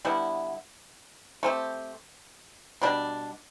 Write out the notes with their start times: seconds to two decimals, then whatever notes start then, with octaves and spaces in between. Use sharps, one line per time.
0.05 D3 G3 B3 E4
1.43 A3 C4 G4
2.82 B2 G3 D4